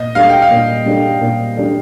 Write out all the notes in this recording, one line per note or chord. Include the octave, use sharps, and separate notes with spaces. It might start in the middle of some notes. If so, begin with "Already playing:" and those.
Already playing: A#2 D#5
G3 D4 A4 F5
G5
F5
A#2
G3 D4 A4
A#2
G3 D4 A4